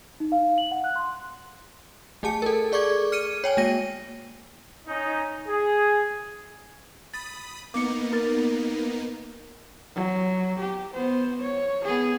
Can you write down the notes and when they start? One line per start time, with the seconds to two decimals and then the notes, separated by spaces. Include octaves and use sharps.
0.20 D#4
0.32 F5
0.58 F#7
0.71 F#5
0.84 F#6
0.96 C6
2.23 A3 G#4 A5 C#7
2.42 A4 A#4
2.72 G#4 D5 C#6 D6 G#6
3.12 F6 C#7 D#7
3.44 C#5 G5 G#5
3.57 G#3 A#3 A#6 D#7
4.87 C#4 D#4
5.48 G#4
7.14 B5 D#6 A6
7.74 A#3 B3 D#4 D6 C#7
8.13 A#4 A6
9.96 F#3
10.59 G4
10.94 B3 C5
11.41 C#5
11.84 B3 G#4